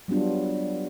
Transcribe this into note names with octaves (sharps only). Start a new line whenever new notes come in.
F#3 G3 B3 D4 F4